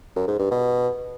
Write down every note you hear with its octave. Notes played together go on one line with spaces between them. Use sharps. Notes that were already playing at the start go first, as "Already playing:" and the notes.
F#2
G#2
G2
B2